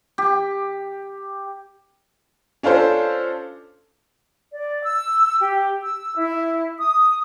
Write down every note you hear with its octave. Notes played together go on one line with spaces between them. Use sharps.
G4
C#4 D4 F4 A4 C5
D5
E6
G4
E6
E4
D#6